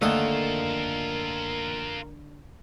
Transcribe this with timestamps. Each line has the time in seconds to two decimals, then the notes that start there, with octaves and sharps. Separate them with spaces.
0.02 D#2 D3 A3 F4 A4 A#4 D#6